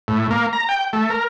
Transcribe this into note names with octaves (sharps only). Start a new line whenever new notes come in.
A2
A#3
A#5
G5
A3
A#4